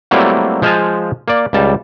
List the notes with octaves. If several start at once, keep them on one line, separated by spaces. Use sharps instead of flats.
F#3 G3 A3 A#3 C4 E4
F3 G#3 C5 F5 G#5 A5
A#3 D5
C#2 G3 A5